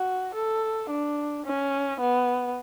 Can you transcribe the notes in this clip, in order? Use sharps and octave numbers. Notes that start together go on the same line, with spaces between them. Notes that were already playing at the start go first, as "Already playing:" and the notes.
Already playing: F#4
A4
D4
C#4
B3